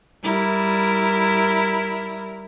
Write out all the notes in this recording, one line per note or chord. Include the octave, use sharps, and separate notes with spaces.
G3 E4 A#4